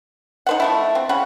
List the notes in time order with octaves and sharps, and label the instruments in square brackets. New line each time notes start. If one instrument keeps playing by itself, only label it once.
[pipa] D#4 C5 F#5
F3 A3 E4
C4
C#3 C#4 F#5 B5